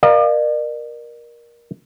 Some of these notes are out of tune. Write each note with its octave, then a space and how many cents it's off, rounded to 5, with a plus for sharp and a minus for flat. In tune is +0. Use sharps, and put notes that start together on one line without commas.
A#4 +20 D5 +45 F5 +0